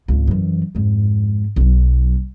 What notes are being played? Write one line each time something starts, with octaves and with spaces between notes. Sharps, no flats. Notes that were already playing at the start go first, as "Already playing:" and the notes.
G#1 C#2
F#2 E3
F2 G#2
B1 F#3